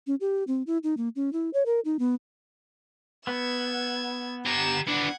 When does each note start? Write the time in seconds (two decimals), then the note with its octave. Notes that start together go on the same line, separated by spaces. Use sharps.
0.07 C#4
0.21 G4
0.47 C4
0.67 E4
0.83 D#4
0.97 A#3
1.16 C#4
1.33 E4
1.54 C#5
1.66 A#4
1.85 D#4
1.99 B3
3.27 B3 E6 G#6
4.46 G4 A#5 G#6 E7
4.87 B3 D4 F#5 G#6